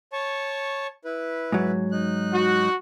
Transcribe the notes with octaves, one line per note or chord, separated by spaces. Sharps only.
C#5 A5 C#6
E4 B4
G#2 F#3
D#4 F#6
F#4